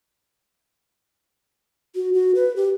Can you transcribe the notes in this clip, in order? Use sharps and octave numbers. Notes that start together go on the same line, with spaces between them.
F#4
F#4
B4
G4